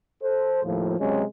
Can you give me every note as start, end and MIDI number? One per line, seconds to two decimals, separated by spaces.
0.22 0.62 69
0.22 0.62 72
0.64 0.97 39
0.64 0.97 45
0.64 0.97 53
0.99 1.23 48
0.99 1.23 54
0.99 1.23 56
0.99 1.23 61